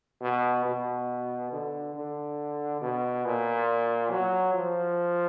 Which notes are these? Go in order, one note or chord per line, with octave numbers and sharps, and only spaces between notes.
B2
B2
D3
D3
B2
A#2
F#3
F3